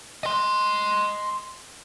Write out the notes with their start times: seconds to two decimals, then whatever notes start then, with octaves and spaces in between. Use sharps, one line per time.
0.23 D#5 C6